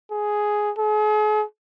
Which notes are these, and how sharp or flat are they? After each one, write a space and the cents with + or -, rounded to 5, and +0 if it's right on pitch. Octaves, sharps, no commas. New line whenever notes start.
G#4 +5
G#4 +40